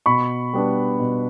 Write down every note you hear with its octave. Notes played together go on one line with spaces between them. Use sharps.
B2 B5 C#6
G3 B3 D4
B2